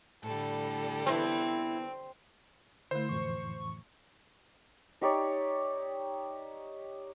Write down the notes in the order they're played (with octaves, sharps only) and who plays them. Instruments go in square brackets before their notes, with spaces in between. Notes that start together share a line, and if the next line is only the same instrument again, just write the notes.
[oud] A2 [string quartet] D3 G3 A4
[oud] E3 B3 [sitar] C4 [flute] E4
[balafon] D3 A3 [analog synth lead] E4 [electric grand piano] C5
[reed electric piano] F2 A2 E3 [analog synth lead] C#6
[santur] D#4 G4 C#5 D5